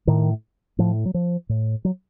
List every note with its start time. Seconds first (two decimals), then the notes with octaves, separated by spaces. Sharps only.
0.07 A2 D#3
0.79 A2 F3
1.06 F#3
1.14 F3
1.49 A2
1.85 F#3